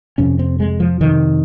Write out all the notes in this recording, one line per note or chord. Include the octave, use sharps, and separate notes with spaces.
F2 C3 C#4
C4
G#3
F3
F2 C3 D#3